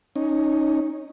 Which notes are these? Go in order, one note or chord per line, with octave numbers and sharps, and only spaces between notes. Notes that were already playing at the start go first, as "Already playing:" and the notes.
C#4 D#4